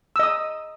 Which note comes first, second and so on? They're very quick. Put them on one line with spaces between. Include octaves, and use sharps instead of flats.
E6 D#5 D#6